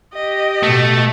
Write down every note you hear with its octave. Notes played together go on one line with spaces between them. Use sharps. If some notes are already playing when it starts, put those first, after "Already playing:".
G4 D#5
B2 A3